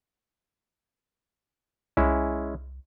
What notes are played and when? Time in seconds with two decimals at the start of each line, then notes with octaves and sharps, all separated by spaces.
1.97 C2 G#3 C#4 E4